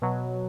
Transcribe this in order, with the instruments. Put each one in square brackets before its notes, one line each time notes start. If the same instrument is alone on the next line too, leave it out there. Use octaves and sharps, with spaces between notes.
[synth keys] B2 F#3